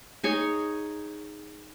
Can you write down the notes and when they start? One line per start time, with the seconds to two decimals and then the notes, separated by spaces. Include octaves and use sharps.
0.24 D#4 G#4 C#5